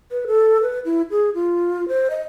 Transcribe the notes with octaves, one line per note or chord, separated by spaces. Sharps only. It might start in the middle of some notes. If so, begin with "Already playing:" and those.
B4
A4
B4
E4
G#4
F4
C5
D#5